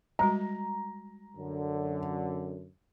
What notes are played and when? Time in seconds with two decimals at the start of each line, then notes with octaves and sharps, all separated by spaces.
0.19 G3 G#3 F#4 A#5
1.37 F#2 D3